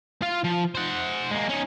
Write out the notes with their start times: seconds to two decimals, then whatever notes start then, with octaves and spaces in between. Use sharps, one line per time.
0.23 F4 F5
0.45 F3
0.75 C5 F#5
1.31 G#3 A#3
1.49 C#4 D#4